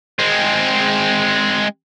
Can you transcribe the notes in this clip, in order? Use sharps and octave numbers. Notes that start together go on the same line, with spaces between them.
G#3 C4